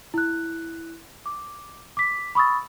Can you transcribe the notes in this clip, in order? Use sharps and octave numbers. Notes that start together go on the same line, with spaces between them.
E4 F#6
D6
D6 B6
B5 C#6 D#6 E6 A6